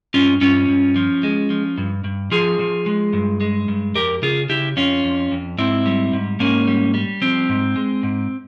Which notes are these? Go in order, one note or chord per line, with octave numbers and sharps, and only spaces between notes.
G2 C#4 F4
G2 C#4 F4
G2
F3
G#3
F3
G2
G2
F3 F4 G#4
F3
G#3
G2
G#3
G2
F2 G4 A#4
C#3 F4 G#4
C#3 E4 G4
F2 C#4 F4
F2
F2
G#2 C4 E4
G3
G#2
G#2 A#3 C#4
G3
G3
F3 C4
G#2
G#3
G#2